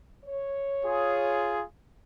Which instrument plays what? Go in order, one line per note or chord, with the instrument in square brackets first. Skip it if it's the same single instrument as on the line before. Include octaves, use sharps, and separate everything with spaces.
[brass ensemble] C#5
[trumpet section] F4 G#4